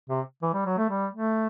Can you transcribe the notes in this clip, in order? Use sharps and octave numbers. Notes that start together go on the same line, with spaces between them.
C3
E3
G3
F#3
A3
G3
A3